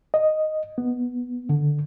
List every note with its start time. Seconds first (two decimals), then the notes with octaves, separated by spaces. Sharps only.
0.14 D#5
0.78 B3
1.49 D3